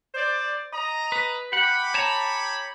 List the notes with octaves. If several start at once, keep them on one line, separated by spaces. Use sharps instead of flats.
C5 D5
D#5 A#5
B4
G4 F#5 B5
C#5 A5 A#5